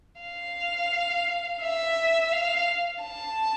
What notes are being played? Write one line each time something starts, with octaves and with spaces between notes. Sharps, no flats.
F5
E5
F5
A5